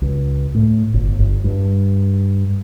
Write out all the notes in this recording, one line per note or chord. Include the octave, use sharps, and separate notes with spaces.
C#2
A2
G1
G1
G2